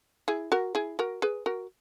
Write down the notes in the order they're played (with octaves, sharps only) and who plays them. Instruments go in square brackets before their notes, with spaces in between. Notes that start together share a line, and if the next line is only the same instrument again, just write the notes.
[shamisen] E4 G#4
F#4 A#4
E4 G#4
F#4 A#4
G#4 B4
F#4 A#4